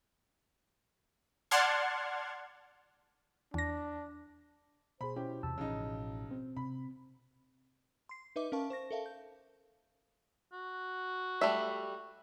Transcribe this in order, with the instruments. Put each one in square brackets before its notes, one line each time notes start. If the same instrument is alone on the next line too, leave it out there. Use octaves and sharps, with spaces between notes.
[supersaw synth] D5 F#5 A5 C6 F6 G#6
[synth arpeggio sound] E2 A#6 [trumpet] D4
[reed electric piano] B2 G#4 [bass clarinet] C5 [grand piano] B5
[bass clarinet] B2 [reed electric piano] C#4 E4 C5 [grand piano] G4
[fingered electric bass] E2 C3 [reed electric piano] A5 E6
[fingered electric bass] A1 E3 F3 [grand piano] C#3 D#4
[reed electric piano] C4
[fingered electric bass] C3 [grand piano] B5
[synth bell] C6 C7
D#4 B4 D#5 E5 D6
C#4 A#4 F5 A5 C#6
C5 C#6 A#6
A4 A#4 E5 F5 A5
G6
[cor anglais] F#4
[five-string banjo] G3 A3 E5